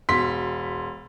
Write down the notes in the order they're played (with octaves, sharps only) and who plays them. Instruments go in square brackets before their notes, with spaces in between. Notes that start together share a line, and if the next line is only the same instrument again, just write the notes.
[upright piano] E1 C6 B6